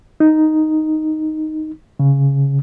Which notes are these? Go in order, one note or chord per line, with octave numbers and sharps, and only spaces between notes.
D#4
C#3